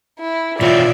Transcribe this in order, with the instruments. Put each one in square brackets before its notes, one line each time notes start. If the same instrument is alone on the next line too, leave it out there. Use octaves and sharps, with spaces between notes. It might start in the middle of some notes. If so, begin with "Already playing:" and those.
[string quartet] E4
[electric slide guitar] B2 E3 C#5 [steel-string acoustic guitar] F4 F5 [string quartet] D5 E5